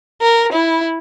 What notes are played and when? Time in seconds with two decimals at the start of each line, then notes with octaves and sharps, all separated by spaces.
0.21 A#4
0.53 E4